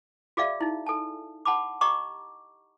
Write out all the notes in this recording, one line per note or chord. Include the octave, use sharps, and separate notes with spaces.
F#4 G#4 D5 E5 F5
D#4 E4
A4 G#5 A5
F#5 A5 B5 D6
G4 D#5 A#5 C#6 D6